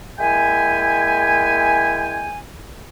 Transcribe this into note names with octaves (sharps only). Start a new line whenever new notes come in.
G#3 A#3 E4 E5 G5 G#5